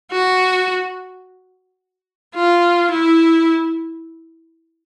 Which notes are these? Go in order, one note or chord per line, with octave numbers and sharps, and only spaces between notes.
F#4
F4
E4